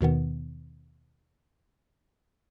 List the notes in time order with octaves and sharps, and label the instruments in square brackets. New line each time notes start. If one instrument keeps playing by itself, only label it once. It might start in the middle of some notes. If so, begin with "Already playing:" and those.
[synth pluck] D#2 B2 D#3 B3